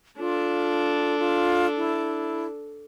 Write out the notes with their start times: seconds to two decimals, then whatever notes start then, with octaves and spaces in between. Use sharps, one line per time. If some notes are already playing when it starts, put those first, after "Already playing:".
0.19 D4 F4 A4
1.19 F4
1.77 E4